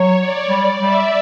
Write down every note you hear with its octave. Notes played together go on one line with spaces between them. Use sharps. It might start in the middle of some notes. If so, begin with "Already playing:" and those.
Already playing: F#3 C#5
D5
G3 D5
G3 E5